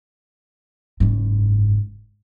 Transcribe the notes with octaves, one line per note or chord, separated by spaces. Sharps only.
F#1 G#2